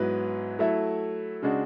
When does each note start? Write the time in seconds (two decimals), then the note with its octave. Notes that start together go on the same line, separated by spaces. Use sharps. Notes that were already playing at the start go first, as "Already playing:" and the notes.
Already playing: G#2 F#3 B3 E4 B4
0.59 F#3 A3 E4 A4 E5
1.42 C#3 G#3 D4 F#4